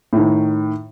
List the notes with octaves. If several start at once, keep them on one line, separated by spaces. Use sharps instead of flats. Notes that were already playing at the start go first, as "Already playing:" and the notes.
A2 D#3